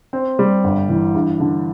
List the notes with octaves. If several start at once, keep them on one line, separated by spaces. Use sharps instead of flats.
C4
G3
G1
E3
G2
D3